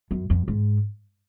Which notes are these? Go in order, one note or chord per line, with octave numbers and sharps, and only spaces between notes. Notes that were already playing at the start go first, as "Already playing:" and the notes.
F#2
F2
G#2